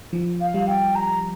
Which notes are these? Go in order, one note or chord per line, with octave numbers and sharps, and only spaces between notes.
F3
F5
G3 F5
G5
A#5